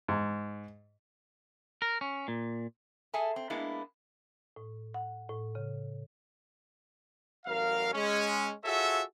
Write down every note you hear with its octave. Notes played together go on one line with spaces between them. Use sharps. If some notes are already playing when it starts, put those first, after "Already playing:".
G#2
A#4
C#4
A#2
G#4 A4 E5 G#5 A5
C4
G#3 A#3 B3 D4 E4
A2
F#5
A2
C#3
A1 F#3 A#4 F5
G#3 C#4
F4 F#4 G#4 A4 C#5 E5